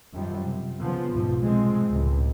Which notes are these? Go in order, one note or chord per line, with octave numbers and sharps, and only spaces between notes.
F#2 D#3 F3 G3
C3
C#3 F3 B3
B1 E2 G#2 B2 F3
C3 F3 G3 G#3 C4
C#2 A2